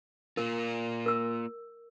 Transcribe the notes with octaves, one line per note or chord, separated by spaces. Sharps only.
A#3 F4 A#4
A#4 E6